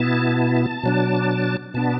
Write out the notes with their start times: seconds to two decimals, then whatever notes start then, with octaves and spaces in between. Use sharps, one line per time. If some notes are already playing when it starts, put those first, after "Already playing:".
Already playing: B2 B3 E4 A5
0.83 B2 F#3 D4
1.74 B2 B3 D4 A5